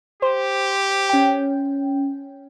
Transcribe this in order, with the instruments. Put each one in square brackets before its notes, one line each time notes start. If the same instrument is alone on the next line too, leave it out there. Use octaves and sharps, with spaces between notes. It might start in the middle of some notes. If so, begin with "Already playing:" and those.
[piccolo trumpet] G4 [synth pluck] C5
[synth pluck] C#4 G5